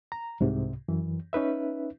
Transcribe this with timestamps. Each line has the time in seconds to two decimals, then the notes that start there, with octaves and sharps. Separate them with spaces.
0.12 A#5
0.40 C2 G#2 C3
0.88 F#2 E3
1.33 C#4 D#4 B4 E5